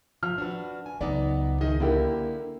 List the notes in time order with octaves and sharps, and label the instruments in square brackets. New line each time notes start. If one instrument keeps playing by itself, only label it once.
[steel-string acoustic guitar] F3 [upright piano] F6
[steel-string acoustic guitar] D4 F#4 B4
G#5
[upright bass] C#2 F#3 [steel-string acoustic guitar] B3 D#4 [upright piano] D5
[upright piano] D#3 [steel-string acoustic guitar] G#4 D#5
[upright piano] D3 E4 G4 [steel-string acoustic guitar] A#3 A#4